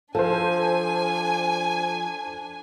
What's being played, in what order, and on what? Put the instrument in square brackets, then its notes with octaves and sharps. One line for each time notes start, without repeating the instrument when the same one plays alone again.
[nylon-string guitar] F3 [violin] D4 G#5 [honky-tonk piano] A4 C5